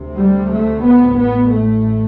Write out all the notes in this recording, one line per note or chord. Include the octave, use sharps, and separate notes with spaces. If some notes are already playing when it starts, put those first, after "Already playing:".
Already playing: D2 C3
G3
A3
B3
A1 A2 B3
A3